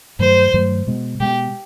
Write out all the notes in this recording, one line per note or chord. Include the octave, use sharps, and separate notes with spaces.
G2 D#3 F#3 A3 C5
G2 D#3 F#3 A3
B2 G#3 B3
B2 G#3 B3 G4